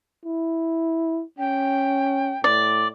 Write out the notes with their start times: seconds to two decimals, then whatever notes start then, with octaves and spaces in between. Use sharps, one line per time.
0.25 E4
1.39 C#4 G5
2.44 A2 D5